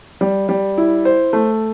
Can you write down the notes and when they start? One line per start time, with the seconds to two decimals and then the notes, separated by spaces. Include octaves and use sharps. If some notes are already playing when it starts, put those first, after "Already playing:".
0.21 G3
0.49 G3
0.78 E4
1.05 C5
1.33 A3